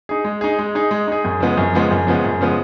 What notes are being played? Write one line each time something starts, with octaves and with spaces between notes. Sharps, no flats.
D#4 G#4
G#3
D#4 G#4
G#3
D#4 G#4
G#3
D#4 G#4
F#2
C#3 F3 G#3 B3
F#2
C#3 F3 G#3 B3
F#2
C#3 F3 G#3 B3
F#2
C#3 F3 G#3 B3